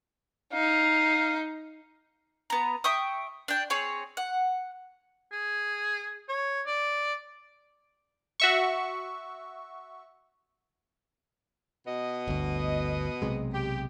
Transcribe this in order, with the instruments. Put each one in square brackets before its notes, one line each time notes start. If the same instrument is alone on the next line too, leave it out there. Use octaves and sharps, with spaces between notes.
[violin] D#4 [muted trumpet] F5
[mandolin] B3 A#5
E5 G5 C#6 D#6
D4 G5
C4 G#4 C#5
F#5
[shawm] G#4
C#5
D5
[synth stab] F#4 E5 C#6
[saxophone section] B2 B3 D#5
[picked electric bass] G1 D2
B1 C3 G#3
[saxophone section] G4